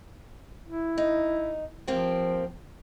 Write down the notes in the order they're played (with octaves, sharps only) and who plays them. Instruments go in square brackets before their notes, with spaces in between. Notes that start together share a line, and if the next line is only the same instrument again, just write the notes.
[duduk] E4
[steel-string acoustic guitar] D#4
[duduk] F3 [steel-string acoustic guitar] A#3 C4 G4